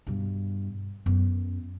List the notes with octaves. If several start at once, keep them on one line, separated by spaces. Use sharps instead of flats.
G2 B2
F#2 B3